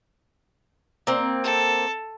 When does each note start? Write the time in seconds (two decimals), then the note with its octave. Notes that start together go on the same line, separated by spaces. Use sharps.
1.07 A#3 C4
1.43 A4